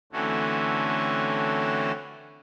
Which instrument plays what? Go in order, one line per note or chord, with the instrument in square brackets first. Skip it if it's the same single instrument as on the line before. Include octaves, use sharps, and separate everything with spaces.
[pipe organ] D3 E3 A3 C4 C#4 F#4